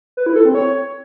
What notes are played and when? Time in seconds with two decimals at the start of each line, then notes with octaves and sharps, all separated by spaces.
0.17 B4
0.26 E4
0.36 A4
0.45 C4
0.55 C#5